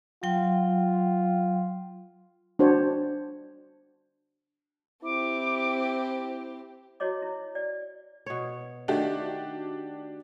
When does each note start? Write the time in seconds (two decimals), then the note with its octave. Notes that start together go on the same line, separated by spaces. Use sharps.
0.23 F#3 F4 G5
2.59 D4 F#4 C5 C#5 A5
5.04 C4 E4 G4 D6
7.00 E4 F#4 C#5 D#5 D6
7.22 E4
7.55 D5
8.26 B2 C#5
8.88 D#3 A3 D4 F#4 G4